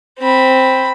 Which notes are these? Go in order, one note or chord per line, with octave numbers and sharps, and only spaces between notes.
C4 B5